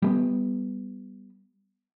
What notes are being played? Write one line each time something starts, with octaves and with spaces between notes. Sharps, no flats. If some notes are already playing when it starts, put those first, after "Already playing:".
G3 G#3 B3